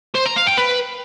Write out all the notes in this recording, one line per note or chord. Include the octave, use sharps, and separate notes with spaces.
C5
A#5
F5
G5
B4